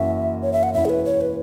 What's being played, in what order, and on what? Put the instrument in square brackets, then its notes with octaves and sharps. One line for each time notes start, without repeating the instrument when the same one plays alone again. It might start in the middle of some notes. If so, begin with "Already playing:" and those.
Already playing: [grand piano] F#1 F#2 E3 C#4 F#4 [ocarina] E5
[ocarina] C#5
E5
F#5
[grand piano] E1 E2 E3 C#4 E4 [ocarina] E5
[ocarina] G#4
B4
C#5
B4